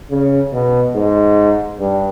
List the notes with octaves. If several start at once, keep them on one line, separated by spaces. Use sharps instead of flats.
C#3
B2
G#2
G2